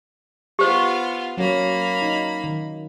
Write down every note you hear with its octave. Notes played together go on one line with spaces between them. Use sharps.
B3 F4 G4 C5
F#3 A#3 C#4 C#5 B5
D#4
D#3